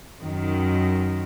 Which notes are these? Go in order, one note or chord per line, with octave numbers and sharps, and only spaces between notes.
F#2 D#3